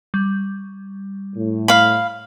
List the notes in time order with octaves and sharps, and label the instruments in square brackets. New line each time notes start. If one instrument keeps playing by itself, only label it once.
[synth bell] G3
[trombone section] A2
[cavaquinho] F5 B5